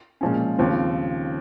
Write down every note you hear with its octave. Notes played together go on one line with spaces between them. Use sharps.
A#2 F3 G#3 C#4
D#2 C#3 F3 C4